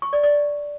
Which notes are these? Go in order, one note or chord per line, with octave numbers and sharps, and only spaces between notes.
C#6
D5
D5